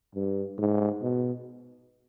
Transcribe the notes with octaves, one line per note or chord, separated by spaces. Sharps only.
G2
G#2
B2